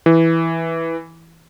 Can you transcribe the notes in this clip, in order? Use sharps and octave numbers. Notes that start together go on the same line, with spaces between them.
E3